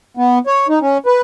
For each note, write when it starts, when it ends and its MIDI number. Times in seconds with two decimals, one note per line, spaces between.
0.17 0.39 59
0.47 0.67 73
0.69 0.79 63
0.82 0.98 61
1.06 1.22 71